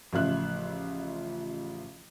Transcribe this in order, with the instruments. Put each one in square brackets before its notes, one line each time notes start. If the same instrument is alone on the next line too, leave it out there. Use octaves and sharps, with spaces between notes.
[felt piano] A1 C#3 F3 F4 E5 F#6